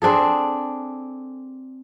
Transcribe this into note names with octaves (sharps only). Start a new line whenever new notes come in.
C4 D4 G#4 A4